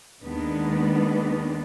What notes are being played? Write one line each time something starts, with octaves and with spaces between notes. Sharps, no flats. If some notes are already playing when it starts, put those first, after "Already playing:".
D#2 D#3 G#3 B3 D4